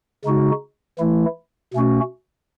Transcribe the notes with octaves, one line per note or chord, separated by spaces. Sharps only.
C#3 G#3 D#4 F#4
E3 A3 E4
B2 A3 C#4 F#4